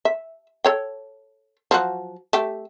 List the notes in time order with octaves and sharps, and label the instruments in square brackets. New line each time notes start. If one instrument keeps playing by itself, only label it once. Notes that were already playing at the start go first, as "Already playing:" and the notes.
[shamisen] E5
A4 C#5 G5
F3 F#3 F#4
A3 G4